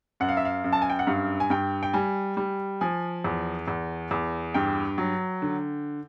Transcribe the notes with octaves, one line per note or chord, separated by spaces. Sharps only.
F#2 F#5
F5
E5
F5
F#2
A5
G#5
G5
F#5
G2 F5
G#5
G2 G5
G5
G3 G#5
G3
F3 G#5
E2
E2
E2
G2 G5
F#3
D3